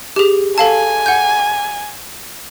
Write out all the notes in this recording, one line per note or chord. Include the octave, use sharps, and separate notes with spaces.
G4 G#4
A4 F5 G#5 A5
F#5 G6